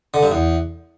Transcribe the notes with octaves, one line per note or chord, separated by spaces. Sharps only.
D3
G2
E2